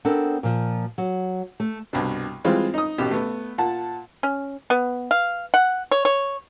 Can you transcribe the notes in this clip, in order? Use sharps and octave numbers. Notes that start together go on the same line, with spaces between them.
B3 C4 D4 A4 A#4
A#2 F3
F#3
A3
C2 G2 B2
E3 G3 G#3 C4 F4
D#4 D#6
A1 B2 G4
A3 B3
A#2 F#5 A5
C#4
B3
F5
F#5
C#5
C#5